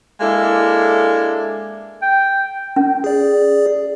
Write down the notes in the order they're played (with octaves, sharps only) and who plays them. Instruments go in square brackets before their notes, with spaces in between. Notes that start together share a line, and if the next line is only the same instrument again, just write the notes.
[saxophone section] G#3 A#3 D4 E4 A4
[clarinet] G5
[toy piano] C#4
[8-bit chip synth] G#4 D5